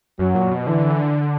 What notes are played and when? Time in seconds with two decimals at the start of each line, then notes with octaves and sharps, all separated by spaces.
0.19 F#2 F#3
0.35 A#2
0.51 B2
0.67 D3 E3